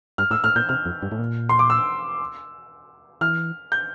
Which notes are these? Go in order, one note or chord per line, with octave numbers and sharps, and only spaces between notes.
G2 F6
A2 E6
A2 F6
A#2 G6
C3 F6
F2
G2
A2
A#2
C6
D6
E6
E3 F6
G6